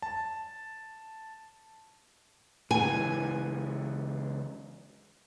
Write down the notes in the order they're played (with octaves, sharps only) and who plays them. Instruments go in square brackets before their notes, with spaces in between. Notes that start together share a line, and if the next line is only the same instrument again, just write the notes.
[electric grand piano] A5
[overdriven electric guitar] C#2 E3 [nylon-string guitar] G#5